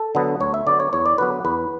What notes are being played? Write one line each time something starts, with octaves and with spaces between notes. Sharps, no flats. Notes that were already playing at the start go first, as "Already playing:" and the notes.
Already playing: A4
D3 F#3 B3
D2 C#5
E5
D3 F#3 B3 D5
C#5
E2 C#5
D5
D3 F#3 B3 B4
E2 B4